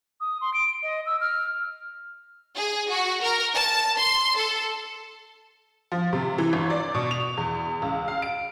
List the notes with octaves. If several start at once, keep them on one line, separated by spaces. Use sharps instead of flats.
D#6
C6
D7
D#5
E6
F6
G#4
F#4
A#4
A5
C6
A4
F3
C3
E3
G1
D5
B2
F7
E2
C#2
F5
D7